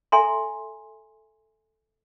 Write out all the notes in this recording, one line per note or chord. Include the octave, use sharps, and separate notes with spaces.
A4 E5 G#5 A#5 C6